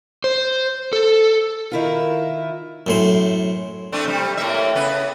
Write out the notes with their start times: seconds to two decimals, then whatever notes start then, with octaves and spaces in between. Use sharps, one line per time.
0.24 C5
0.93 A4
1.71 D#3 E4 F4 A#4
2.87 F#2 A2 C5
3.92 A3 C4 D4
4.05 C3 G3
4.37 A2 A#3 E5
4.75 C#3 B3 B4